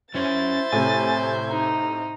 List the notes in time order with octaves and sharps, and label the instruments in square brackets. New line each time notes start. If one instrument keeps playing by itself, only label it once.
[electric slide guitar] F#3 C#4 C#5 [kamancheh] E4 C5 [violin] A6
[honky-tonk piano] A2 C3 [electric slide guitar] G#5
[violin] D#4